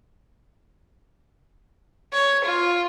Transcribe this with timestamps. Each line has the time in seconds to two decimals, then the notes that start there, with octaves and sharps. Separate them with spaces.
2.13 C#5
2.44 F4